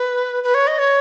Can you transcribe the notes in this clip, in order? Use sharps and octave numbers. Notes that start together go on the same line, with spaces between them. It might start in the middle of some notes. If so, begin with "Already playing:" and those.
Already playing: B4
B4
C#5
D#5
C#5